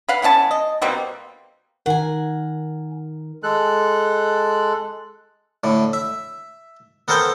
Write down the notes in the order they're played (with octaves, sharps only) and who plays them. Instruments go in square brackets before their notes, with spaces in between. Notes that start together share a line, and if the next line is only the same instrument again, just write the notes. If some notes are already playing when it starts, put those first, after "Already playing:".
[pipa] B4 F5 F#5
E3 B3 C#4 A5
D#5
B2 G3 A#3 C4
[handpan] D#3 A#4 [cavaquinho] F#5 G#5
[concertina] G#3 A4 F#6
[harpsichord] A2 D3
E5
B3 A4 A#4 C5 F5 G5